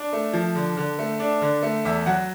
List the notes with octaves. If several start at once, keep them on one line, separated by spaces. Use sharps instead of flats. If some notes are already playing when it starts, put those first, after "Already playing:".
Already playing: D4
A3
F3
D3
D3
A3
D4
D3
A3
E2 E5
F#3 F#5